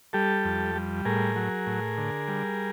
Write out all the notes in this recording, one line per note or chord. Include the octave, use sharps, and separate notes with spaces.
G3 G4 A4
F2
G3
A2 G#4 A#4
F#3
A2
D3
G3